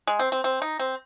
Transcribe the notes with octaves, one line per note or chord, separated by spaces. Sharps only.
G#3
C4
C4
C4
D#4
C4